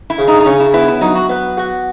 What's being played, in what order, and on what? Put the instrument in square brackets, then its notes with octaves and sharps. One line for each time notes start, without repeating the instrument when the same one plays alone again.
[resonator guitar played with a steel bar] E4
[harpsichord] C#3
[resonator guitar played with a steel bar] D#4
D#4
[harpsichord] C#3 [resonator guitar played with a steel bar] C#4
[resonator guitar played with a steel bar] E4
[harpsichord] B3 [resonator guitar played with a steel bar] E4
[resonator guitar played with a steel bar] E4
[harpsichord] F#3 [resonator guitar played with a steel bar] D#4
[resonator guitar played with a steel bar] F#4
[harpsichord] B3
F#4